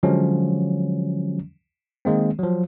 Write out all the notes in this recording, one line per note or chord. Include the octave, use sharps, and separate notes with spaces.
D3 F3 F#3 G#3 C#4
D#3 G#3 A#3 C4
F3 F#3